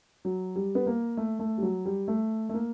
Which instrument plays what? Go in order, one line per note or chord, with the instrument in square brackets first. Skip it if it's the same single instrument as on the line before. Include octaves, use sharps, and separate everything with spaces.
[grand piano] F#3
G3
B3
A#3
A3
A3
G3
F#3
G3
A3
A3
A#3